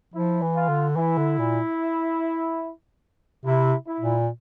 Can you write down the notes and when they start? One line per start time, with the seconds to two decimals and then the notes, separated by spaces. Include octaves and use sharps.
0.14 F3 E4
0.42 E3
0.55 F4
0.69 D3
0.96 E3 E4
1.18 D3
1.39 A#2
3.45 C3 E4
3.86 E4
4.00 A#2